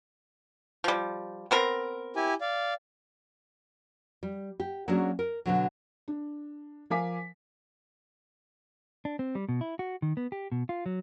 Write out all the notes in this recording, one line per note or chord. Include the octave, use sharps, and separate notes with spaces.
F3 G3
B3 C4 A#4
E4 G4 G#5
D5 F5
G3
G4
F#3 A#3 C#4 D4 F#4 G#4
A#4
B2 D3 F#3
D4
F3 A#4 F5 G#5 D6 B6
D4
C4
G3
B2
E4
F#4
D#3
B3
G4
B2
F4
F#3